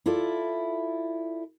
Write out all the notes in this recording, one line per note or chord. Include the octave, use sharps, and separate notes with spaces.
E4 F4 A4 D5